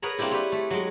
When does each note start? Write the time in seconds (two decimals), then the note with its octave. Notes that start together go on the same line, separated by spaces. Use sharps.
0.02 G#4 A#4 B4 C#5 F#5 A#5
0.18 G3 A#3 C4 D4 E4 G4
0.31 E4 G4 B4 C#5 C6
0.52 A3
0.70 F#3 G#3